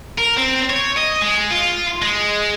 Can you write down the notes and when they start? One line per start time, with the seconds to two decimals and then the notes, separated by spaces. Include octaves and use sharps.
0.18 A#4
0.38 C4
0.70 C#5
0.98 D#5
1.22 G#3
1.51 F4
2.02 G#3